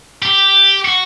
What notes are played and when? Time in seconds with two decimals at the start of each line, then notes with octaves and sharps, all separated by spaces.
0.22 G4
0.85 F#4